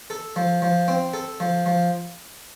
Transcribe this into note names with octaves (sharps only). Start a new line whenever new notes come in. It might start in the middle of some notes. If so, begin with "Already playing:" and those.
A4
F3
F3
C4
A4
F3
F3